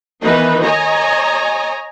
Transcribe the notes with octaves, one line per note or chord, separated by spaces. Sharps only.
D#3 E3 B3 D#4 B4
C#5 D#5 G#5 A#5